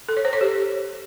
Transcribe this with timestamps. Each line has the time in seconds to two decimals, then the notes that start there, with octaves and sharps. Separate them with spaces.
0.09 A4
0.17 C#5
0.25 C5
0.33 C#5
0.41 G4